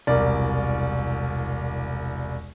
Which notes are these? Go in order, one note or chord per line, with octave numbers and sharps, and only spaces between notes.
E1 C2 A#4 D5